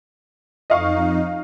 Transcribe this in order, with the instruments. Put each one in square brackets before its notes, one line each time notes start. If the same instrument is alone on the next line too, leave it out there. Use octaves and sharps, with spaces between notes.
[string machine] F2 D#4 [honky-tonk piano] D#5 F5 C#6